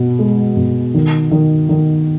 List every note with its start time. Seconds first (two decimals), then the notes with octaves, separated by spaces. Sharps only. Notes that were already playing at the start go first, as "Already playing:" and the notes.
Already playing: B2
0.19 G#3
0.57 B2
0.94 D#3
1.31 D#3
1.69 D#3